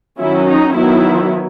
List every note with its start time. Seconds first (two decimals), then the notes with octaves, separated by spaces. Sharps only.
0.20 D#3 F#3 C#4 E4
0.48 D#4
0.76 D#3 F#3 B3 E4